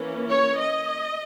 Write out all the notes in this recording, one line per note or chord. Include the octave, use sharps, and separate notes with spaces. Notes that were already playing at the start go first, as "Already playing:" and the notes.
Already playing: E3 A#3 C#4
C#5
D#5